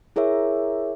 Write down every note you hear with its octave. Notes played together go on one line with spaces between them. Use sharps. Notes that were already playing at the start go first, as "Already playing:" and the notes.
E4 G#4 A#4 C#5 E5